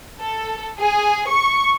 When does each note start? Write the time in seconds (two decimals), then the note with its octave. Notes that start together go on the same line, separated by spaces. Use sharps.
0.19 A4
0.79 G#4
1.30 C#6